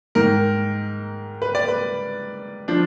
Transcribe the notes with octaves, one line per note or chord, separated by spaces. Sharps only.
G#2 D#3 A#4
B4
D5
B4
F3 D4